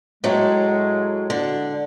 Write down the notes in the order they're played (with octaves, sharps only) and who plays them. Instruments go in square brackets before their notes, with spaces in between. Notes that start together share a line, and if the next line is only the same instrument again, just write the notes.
[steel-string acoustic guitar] A2 F#3 [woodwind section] G#3
[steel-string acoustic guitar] D3